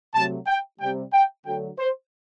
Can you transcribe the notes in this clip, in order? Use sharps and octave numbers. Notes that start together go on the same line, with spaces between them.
C3 F#3 A3 A5
G5
C3 G3 G5
G5
D3 F#3 A3 G5
C5